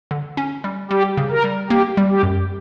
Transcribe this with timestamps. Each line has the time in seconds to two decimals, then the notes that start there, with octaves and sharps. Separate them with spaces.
0.11 D3
0.37 C#4
0.64 G3
0.91 G3 G4
1.17 C#3
1.31 A#4
1.44 G3
1.70 A#3 G4
1.97 G3
2.10 G4
2.23 F#2